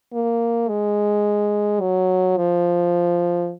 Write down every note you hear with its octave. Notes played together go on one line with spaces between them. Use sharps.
A#3
G#3
F#3
F3